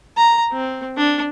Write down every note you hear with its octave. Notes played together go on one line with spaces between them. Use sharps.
A#5
C4
D4